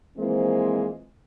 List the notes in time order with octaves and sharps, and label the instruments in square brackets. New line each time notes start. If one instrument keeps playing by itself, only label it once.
[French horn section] E3 F3 G#3 A#3 C4